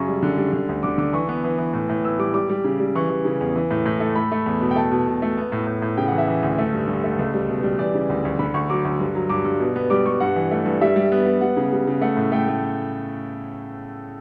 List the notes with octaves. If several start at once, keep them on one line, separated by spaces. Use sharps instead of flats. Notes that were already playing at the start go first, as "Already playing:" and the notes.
Already playing: F#2 C#3 C#6
G3
D3
G3
D3
D2
D3 D6
D3 D6
E3 C#6
B3
E3
E3
A2
A2
B3 E6
G3 D6
G3 D6
G3
C#3
G3
E3 C#6
E3
C#3
E2
E3
A2
A2
A3
A3 B5
A3
E2
B2
G5
A3 A5
B2
B2
A3
B3
A2
A2
A2
C#3 G5
F#5
E3
E5
E3
D2
A3
G2
G2
A3
C#2
G3
B2
G3
E3 D5
C#3
D2
D2
D3 B5
D2 C#6
F#3 D6
D2
G2
F#3
G2 D6
G2
B2
B3
G3 D6
G3 C#6
G2 F#5
E3
A3
G2
G3 E5
G3
B3
B3
G3 F#5
C#3
G3
C#3
A3 F#5
A2
A3 G5
A3